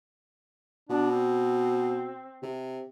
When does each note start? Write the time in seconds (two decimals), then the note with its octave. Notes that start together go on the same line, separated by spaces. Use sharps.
0.89 B2 D4
1.10 C4
2.42 C3